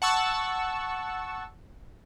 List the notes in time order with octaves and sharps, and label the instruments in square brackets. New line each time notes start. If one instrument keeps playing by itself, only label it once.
[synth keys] F#5 A5 C#6 E6